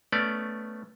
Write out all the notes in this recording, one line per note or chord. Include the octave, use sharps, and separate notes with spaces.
A3 B3 C#4 D5